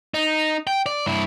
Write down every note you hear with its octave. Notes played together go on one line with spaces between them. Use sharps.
D#4
G5
D5
G2 E4